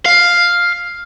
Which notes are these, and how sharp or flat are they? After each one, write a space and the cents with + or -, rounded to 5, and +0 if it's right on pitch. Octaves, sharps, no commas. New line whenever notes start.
F5 +5